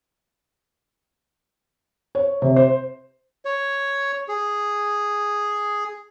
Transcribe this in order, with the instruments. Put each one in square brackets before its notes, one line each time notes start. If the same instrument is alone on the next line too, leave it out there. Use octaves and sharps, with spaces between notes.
[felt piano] C#5
C3
C5
[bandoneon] C#5
G#4